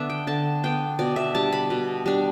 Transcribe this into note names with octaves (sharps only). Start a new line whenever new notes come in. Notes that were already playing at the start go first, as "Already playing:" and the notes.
Already playing: D3 B3 D4 D5 E5
G5
D3 A5
B3 D4 G5
B2 D5
E5
G3 D4 A5
B5
B2
G3 D4